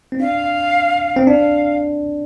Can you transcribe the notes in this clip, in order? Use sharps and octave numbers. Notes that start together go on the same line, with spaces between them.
C4
D4 F5
C4
D4 F5